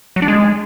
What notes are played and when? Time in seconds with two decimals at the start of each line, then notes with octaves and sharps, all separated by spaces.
0.16 F#3
0.22 D4
0.28 G#3